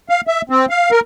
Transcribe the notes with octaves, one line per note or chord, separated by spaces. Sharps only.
F5
E5
C4
F5
A#4